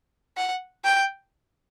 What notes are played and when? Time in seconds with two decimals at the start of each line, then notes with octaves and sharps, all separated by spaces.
0.37 F#5
0.85 G5